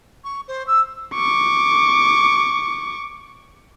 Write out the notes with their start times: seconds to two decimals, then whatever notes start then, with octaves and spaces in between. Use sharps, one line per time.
0.24 C#6
0.48 C5
0.67 E6
1.14 C#6 D6